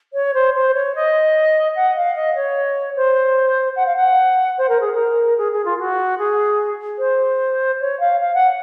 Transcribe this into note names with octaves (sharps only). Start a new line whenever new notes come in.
C#5
C5
C5
C#5
D#5
F#5
F5
D#5
C#5
C5
F#5
F5
F#5
C5
A#4
G#4
A#4
G#4
G#4
F4
F#4
G#4
C5
C#5
F5
F5
F#5